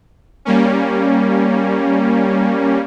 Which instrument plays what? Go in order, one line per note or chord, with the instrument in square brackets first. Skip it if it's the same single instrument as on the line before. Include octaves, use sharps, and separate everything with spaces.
[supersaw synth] G3 A#3 C#4